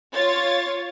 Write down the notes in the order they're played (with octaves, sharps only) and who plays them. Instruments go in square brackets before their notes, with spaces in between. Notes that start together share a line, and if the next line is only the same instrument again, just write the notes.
[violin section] F4 C#5 A6